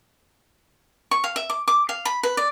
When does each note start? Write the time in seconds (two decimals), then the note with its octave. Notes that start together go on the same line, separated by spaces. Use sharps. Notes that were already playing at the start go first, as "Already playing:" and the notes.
1.11 C#6
1.24 F5
1.36 E5
1.50 D6
1.68 D6
1.89 F5
2.05 B5
2.23 B4
2.37 D5